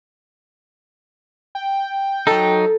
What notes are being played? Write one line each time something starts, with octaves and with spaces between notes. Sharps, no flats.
G5
F#3 D#4 A4